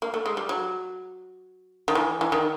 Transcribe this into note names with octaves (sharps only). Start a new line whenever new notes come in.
A#3
A3
G#3
G3
F#3
D#3
E3
E3
D#3